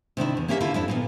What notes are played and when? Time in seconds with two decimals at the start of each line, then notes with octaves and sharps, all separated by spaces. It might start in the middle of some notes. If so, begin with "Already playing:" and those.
0.17 C3 D#3 D4 E4
0.37 E2
0.48 A#3 C#4 G4 A#4 E5
0.60 D3 E4 F4
0.74 F2 D4 E4
0.88 A#2 A#3 B3